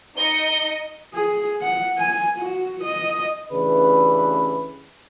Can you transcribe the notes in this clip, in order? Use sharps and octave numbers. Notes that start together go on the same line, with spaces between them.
D#4 D#5 C#7 G7
G#4
F#5
G#5
F#4
D#5
A1 C#3 E3 D4 B4